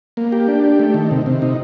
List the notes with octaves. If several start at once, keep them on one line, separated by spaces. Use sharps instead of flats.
A#3
G4
D4
G4
A3
D#3
C3
C3
D#4